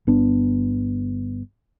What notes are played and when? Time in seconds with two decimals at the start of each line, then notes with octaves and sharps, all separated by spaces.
0.07 G1 B3 D4